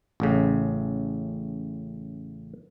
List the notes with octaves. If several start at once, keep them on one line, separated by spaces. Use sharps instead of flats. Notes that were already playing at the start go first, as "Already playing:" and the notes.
A1 A2 C#3